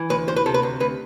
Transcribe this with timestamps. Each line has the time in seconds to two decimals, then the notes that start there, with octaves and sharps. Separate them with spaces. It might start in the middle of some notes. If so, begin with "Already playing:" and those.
Already playing: E3
0.10 D2 B4
0.28 D2 C5
0.36 B4
0.46 C3 A4
0.54 B4
0.63 D2
0.80 D2 B4